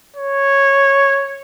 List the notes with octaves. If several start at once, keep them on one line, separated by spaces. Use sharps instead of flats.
C#5